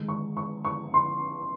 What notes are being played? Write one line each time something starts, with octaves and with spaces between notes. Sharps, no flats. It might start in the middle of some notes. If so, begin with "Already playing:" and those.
Already playing: D#3 G#3
C#6
C#6
C#6
C6